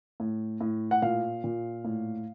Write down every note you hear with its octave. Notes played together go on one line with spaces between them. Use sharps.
A2
A2
F#5
A#2 F5
A#2
A2